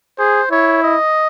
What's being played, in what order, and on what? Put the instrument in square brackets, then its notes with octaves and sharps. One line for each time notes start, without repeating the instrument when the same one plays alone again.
[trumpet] G#4 [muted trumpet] C5
[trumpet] E4 [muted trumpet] C#5
[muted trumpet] D#5